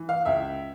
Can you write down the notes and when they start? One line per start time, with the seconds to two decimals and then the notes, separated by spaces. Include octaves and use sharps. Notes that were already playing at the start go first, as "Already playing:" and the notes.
Already playing: E3
0.09 F5
0.25 C#2 E5